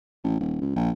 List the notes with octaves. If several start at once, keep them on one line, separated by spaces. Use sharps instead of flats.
A1
D#1
C#2
A#1